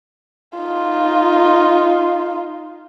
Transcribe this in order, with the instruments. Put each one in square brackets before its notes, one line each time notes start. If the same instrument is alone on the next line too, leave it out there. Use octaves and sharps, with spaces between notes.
[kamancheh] D#4 F4